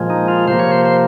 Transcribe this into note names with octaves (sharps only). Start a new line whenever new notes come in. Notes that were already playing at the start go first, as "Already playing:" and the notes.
Already playing: A#2 F3 G#3
D#4
F4
C3 F3 A#3 C5
C#5
C5
C5